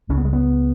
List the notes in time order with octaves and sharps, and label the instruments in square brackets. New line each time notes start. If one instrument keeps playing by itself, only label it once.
[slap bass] C#2 C#3 C#4
B3
G#3
B3